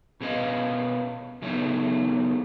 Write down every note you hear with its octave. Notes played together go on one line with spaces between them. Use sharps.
B2 C#4 G4 B4 D#5 F5
C#3 E3 F#3 A3 B3 D#4